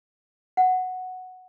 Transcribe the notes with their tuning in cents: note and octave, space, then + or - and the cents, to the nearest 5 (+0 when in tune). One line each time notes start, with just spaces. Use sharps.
F#5 +0